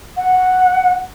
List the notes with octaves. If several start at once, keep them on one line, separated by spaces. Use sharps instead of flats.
F#5